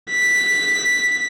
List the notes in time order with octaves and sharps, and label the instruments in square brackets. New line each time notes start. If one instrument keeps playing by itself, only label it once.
[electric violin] B6